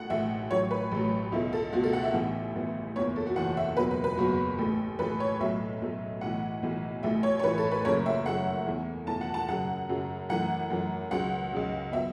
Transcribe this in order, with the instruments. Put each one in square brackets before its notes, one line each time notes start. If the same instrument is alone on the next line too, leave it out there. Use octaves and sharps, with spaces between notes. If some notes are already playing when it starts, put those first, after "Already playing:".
Already playing: [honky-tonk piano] A1 A2 A3 F#5
A1 A2 A3 E5
A1 A2 F#3 C#5
B4
A1 A2 F#3
C#2 B2 A3 E4
A4
C#2 B2 A3 F#4
A4
F#5
E5
A1 A2 E3 B3
A1 A2 E3 B3
F#1 E2 E3 B3 C#5
A4
F#4
F#1 E2 E3 B3 F#5
E5
F#1 E2 B2 F#3 B4
B4
B4
F#1 E2 B2 F#3 F#4
A1 A2 A3
A1 A2 A3 B4
C#5
B1 A2 F#3 A3 E5
B1 A2 F#3 A3
B1 A2 E3 F#5
B1 A2 E3
A1 A2 E3 E5
C#5
C#5
A1 A2 E3 B4
A4
B4
F#1 F#2 C#3 A3 C#5
E5
F#1 F#2 C#3 A3 F#5
E2 E3 A3
E2 E3 A3 A5
F#5
A5
F#2 C#3 F#3 F#5
F#2 C#3 F#3
F#2 E3 A3 F#5
F#2 E3 A3
C#2 C#3 F#3 F#5
C#2 C#3 F#3
F#3 B3 E5